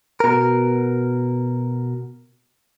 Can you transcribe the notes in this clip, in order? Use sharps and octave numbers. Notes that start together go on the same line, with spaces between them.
B2 A#4